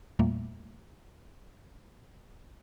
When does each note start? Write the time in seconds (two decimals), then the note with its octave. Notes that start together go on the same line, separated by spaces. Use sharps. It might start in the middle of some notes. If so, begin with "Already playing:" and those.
0.19 E2 A#2 G3 A3 A#3